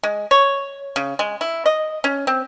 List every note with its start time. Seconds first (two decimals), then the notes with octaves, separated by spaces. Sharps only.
0.03 G#3
0.31 C#5
0.96 C#3
1.19 G#3
1.41 E4
1.66 D#5
2.04 C#4
2.27 C4